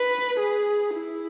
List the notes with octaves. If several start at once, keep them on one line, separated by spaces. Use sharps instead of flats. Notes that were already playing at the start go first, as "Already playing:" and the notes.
Already playing: B4
G#4
E4